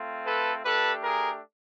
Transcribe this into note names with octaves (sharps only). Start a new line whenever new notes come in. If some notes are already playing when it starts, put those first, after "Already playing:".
Already playing: A3 C4 F4
A4 B4
A3 D4 G4 A4 B4
G#4 A#4